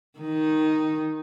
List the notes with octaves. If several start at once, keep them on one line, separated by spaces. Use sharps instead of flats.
D#3 D#4